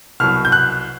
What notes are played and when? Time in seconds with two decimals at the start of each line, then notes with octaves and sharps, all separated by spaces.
0.20 C2 B2 F#3 F6
0.45 G6
0.52 F#6